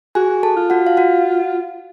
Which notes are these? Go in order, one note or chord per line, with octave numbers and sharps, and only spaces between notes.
F#4 G#4 G#5
A4 A5
F4
F#4 F#5
F5
F#4 F#5